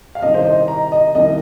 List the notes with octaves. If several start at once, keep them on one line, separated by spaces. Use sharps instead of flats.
F5
C2 C3 D#3 D#5
C5
D#5
A#5
D#5
C2 C3 D#3 D#5